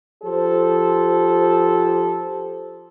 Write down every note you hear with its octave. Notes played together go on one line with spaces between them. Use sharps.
F3 G4 A4 C5